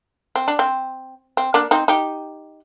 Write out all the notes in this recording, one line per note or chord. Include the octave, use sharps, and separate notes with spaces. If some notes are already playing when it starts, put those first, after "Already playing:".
C4
D4
C4
C4
A#3 D4
C4 D#4
D#4 G4